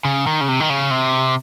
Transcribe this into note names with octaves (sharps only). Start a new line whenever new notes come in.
C#3
D#3
C#3
C3
D#3
C#3
C3